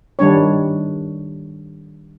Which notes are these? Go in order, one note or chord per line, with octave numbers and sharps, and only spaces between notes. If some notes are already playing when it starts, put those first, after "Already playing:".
D#3 G3 D4 C#5